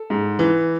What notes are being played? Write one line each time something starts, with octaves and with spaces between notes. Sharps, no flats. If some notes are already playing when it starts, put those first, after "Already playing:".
Already playing: A4
G#2
E3